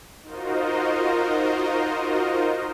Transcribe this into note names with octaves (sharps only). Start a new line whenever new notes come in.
D#4 F4 F#4 A#4 C5 D#5